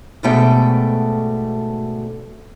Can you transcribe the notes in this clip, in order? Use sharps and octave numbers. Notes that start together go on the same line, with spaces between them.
D2 G#2 B2 D3 A3 G5